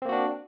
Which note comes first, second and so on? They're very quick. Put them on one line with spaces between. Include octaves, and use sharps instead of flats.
C4 A#3 F#4 D4